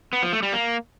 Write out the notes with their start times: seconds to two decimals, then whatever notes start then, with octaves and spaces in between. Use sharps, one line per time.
0.13 B3
0.23 F3
0.33 A3
0.43 G3
0.53 A#3